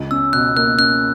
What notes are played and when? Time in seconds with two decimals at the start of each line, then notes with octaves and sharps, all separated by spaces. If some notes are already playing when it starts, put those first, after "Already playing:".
Already playing: C#2
0.11 C#4 E6
0.33 B2 F#6
0.56 A#3 F#6
0.78 C#4 F#6